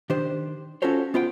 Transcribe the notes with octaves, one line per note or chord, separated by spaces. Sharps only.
D#3 D4 G4 C5
C#4 F4 F#4 A4 C5 C#5
B3 F4 C5 F#5 G5